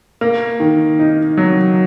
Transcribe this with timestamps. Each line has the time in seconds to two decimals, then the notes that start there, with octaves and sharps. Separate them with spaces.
0.21 A#3
0.60 D#3
0.99 D#4
1.37 F#3